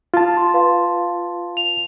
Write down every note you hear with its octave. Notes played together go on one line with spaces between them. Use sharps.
F4 A5
C6
B4 F5 C6
F7